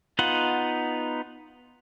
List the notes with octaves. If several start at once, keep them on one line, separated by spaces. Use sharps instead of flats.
B3 D#4 F4 F#5